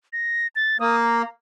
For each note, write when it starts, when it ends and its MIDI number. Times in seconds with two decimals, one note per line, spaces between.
0.13 0.47 94
0.56 0.78 93
0.80 1.22 58
0.80 0.96 87
1.02 1.29 82